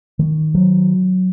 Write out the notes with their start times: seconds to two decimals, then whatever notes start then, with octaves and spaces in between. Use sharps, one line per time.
0.19 D#3
0.55 F#3